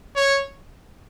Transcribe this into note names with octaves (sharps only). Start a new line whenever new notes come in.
C#5